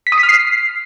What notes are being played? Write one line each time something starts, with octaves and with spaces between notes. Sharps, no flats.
B6
D#6
B6
F6
C7